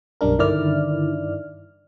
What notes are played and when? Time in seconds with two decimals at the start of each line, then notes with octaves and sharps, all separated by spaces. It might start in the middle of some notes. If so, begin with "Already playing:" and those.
0.21 B1 F#2 G3 D4 A#4
0.38 G2 D3 D#3 E4 D5 F6